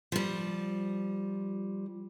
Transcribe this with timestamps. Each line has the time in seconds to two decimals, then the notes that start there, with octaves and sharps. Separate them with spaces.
0.12 F3 G3